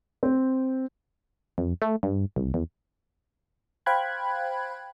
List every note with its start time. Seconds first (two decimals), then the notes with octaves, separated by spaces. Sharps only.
0.23 C4
1.58 F2
1.82 A3
2.03 G2
2.36 C2
2.54 E2
3.86 C5 F5 G5 B5 F#6 G#6